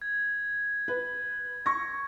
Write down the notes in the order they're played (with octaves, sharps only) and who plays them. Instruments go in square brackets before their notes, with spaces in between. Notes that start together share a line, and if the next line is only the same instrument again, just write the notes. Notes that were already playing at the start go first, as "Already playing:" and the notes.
[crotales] G#6
[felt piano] B4
C#6 A#6